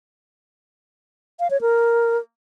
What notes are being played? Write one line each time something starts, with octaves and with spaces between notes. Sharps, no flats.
F5
C#5
A#4